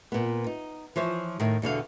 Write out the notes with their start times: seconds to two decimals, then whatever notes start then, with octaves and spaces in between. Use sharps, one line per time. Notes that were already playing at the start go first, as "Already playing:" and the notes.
0.12 A#2 B3
0.47 D#4
0.96 E3 F3 C5 C#5
1.40 A2 D#3
1.62 E2 B2 D3 F5